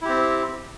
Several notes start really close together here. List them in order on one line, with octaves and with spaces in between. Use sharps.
E4 G4 C4